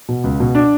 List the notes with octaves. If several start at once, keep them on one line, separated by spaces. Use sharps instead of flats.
B2
C#2
B2
D4